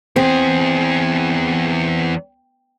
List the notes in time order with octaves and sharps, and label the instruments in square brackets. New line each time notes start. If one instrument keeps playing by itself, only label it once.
[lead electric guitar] E2 G#4 [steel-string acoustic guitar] C4